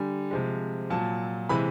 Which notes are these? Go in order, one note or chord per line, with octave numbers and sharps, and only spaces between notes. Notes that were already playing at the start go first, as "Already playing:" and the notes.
Already playing: D3 G3 G#5
C3 F3 G#3
A#2 F#3 A5
C3 E3 G#3 B5